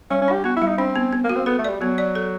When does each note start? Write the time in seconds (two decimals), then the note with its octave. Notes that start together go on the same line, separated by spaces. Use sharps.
0.10 G3 C#4
0.22 C#4
0.28 D4 G4
0.44 B3 F#4
0.57 E4
0.62 G3
0.68 D#4
0.78 C4 D4
0.96 B3
1.13 B3
1.24 A#3
1.29 F#4
1.36 C4
1.46 B3 A4
1.59 A3
1.64 D5
1.70 G3
1.80 F#3 B3
1.98 D5
2.15 A4